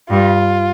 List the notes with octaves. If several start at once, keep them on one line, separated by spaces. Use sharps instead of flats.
G2 F4